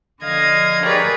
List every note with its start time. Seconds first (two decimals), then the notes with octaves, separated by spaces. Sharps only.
0.23 D3 F3 D#5 F5 G#6 A#6
0.85 G4 G#4 A#4 B4 C#5 D5